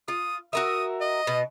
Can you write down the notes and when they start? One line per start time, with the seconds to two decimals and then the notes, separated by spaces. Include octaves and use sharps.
0.08 F4 D#6
0.53 F#4 A#4 E5 D#6
1.01 D#5
1.27 B2